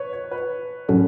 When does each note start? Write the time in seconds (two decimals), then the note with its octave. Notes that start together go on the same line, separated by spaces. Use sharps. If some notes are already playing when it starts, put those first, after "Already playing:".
Already playing: B4 C#5
0.13 C#5
0.31 B4
0.89 A2 F#3 C#4 F#4 A4